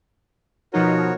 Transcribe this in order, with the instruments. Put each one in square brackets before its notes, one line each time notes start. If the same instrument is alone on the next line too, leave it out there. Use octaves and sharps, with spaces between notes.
[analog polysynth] B2 F3 D#4 [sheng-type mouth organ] F#4 A#4 C#5